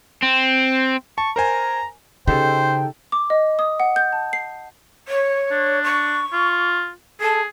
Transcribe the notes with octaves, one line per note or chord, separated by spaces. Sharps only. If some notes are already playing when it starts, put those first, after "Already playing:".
C4
A5 C#6
A#4 C5 G#5 A#5
C#3 D#4 G4 A4 C5 G5
D6
D#5
D#6
F#5
G6
A5
C7
C#5
D4
C#6
F4
G#4 A4